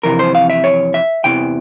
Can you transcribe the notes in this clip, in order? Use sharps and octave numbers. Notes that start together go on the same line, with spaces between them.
F2 C3 E3 A#4
C5
F5
E5
C#5
E5
E2 C3 E3 G5